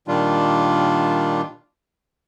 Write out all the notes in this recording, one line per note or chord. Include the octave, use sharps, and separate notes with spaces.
A#2 D#3 G3 D4 F4